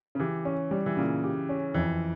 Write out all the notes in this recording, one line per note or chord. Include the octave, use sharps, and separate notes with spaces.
C#3
E3 G4
C#4
G3
E3
A#2 C#3
G4
C#4
F2 E3